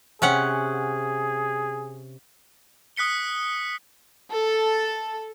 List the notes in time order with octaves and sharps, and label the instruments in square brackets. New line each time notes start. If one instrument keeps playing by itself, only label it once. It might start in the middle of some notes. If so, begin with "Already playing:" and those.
[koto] C3 C#4 F#5 [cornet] G#4
[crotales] D#6 F#6 B6 C#7 G7
[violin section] A4